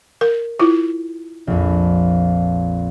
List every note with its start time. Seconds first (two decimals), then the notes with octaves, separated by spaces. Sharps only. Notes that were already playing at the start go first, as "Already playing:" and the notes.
0.21 A#4
0.60 E4 F4
1.47 A#1 F2